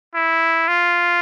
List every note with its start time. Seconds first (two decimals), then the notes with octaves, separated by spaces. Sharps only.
0.15 E4
0.68 F4